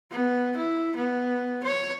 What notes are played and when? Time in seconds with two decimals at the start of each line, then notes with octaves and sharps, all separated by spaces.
0.11 B3
0.56 E4
0.96 B3
1.63 C#5